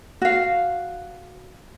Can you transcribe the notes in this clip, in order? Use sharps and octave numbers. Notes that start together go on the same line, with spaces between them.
F#4 F5